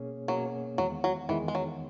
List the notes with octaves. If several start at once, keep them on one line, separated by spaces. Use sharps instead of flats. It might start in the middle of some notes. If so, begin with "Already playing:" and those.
Already playing: B2 A#3 C#4 G#4 C#5
B2 F#3 A#3 C#4 G#4 C#5
E2 D#3 F#3 G#3 B3
F#3
E2 D#3 E3 G#3 B3
G#3
F#3